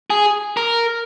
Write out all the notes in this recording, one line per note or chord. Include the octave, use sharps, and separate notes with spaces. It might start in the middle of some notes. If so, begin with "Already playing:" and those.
G#4
A#4